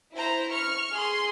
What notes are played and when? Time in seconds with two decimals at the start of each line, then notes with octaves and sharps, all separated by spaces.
0.14 E4 C5 A#5
0.54 C#6 F6
0.93 G#4 C6